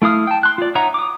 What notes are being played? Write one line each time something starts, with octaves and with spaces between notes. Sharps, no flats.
A3 E4 F5 D#6 F6
G5 A5
C6 F#6
F4 D5
D#4 C#5 E5 F#5 A#5
D6 D#6